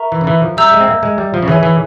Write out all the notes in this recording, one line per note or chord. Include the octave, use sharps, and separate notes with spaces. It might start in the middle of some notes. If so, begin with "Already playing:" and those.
Already playing: A#4 E5 A#5 C#6
E3
C#3
E3
F3
G3 E5 A#5 E6 G6
G#3
C4
A#3
G#3
G3
F3
C#3
E3 G#4 C#5 E5 G#5
E3